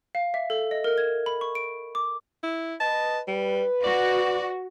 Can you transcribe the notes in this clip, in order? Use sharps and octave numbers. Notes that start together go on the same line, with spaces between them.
F5
E5
A4
D#5
A#4
G#6
B5
C#6
D7
D6
E4
B4 D#5 A5
G3 B4
F#4 D5